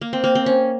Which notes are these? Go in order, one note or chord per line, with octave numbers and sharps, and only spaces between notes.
A#3
C4
A#3
C4
C#4